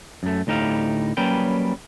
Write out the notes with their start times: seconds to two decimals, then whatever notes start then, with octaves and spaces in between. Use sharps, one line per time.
0.23 F#2 A3
0.47 D2 A2 D#4 G4 F5
1.17 F#3 G3 A#3 C#4 B4 G5